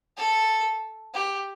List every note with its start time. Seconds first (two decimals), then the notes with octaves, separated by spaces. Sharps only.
0.17 A4
1.14 G4